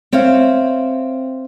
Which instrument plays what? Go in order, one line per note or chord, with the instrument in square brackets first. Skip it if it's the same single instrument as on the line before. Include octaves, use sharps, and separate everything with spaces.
[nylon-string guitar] C4 C#5 E5 F5